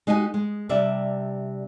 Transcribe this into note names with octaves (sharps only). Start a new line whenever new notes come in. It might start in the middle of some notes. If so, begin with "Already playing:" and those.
G#3 D#4 F#4 G4 G#5
G#3
C3 G3 D4 D5 E5